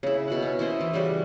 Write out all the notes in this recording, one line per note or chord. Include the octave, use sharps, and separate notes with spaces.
C#3 E4
B2 F#4 F#5
C#4
E4 F#4 C5 D#5
E3
C#3 E3 G3 F#4